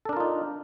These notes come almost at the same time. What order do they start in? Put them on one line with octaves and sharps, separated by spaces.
A4 D4 A#4 F4 D#4